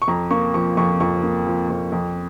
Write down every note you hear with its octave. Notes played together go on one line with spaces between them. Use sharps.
C#6
F2 A#5
A#3 C#6
F3 C#6
F2 C#6
F2 C#6
A#3
F3
F2
F2